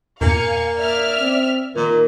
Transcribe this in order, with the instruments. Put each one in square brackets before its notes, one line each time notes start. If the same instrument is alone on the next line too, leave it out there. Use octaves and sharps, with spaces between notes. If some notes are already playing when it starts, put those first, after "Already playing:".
[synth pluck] E2 G2 A#2 [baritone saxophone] A#3 [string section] F5 G#5 C#7
[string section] D5 E5 F6
[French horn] C4
[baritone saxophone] A#2 [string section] D#3 [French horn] A#4